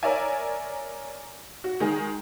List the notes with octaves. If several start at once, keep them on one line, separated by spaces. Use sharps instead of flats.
A#4 C#5 D5 E5 G#5
F#4
D#3 G#3 G#4